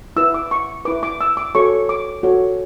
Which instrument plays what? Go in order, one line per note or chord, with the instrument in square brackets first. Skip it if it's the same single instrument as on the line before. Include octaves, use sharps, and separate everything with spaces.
[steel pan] E4 B4 E6
D6
C#6
E4 B4 D6
D6
E6
D6
F#4 A4 C#5 C#6
D6
F#4 A4 C#5